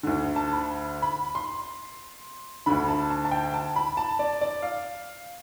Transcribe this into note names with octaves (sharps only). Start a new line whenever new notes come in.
D2 D3
A5
B5
B5
C6
D2 D3 B5
A5
A5
A5
G5
A5
B5
A5
D5
D5
F5